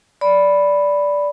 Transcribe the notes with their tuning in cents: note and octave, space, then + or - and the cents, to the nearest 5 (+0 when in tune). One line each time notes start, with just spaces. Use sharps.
D5 -10 B5 +0